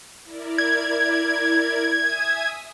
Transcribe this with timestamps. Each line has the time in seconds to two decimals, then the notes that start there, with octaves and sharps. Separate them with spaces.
0.25 E4 A#4 D5
0.58 G#6
1.96 E5 G#5 D#6